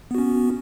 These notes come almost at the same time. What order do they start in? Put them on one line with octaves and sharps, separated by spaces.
B3 F#4 C#4